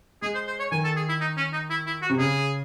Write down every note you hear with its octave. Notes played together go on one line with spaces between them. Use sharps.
G#3 G#4
C5
C5
C#5
D#3 G#5
A4
G#4
E4
D#4
C#4
D#4
E4
E4
F#4
C3
C#3 G#4